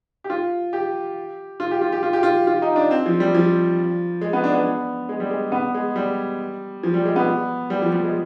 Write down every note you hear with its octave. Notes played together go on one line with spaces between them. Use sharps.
G4
F4
G4
F4
G4
F4
G4
F4
G4
F4
F4
D#4
D4
C4
F3
G3
F3
G#3
B3
D4
B3
G#3
G3
G#3
B3
G#3
G3
F3
G3
G#3
B3
G3
F3
G3
G#3